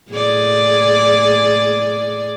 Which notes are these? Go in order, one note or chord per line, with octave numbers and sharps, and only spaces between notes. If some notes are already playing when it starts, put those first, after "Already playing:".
A2 G#4 D5